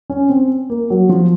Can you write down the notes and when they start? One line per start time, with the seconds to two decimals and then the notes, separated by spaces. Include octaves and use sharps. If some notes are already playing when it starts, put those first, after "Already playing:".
0.10 C#4
0.29 C4
0.70 A#3
0.90 F#3
1.09 F3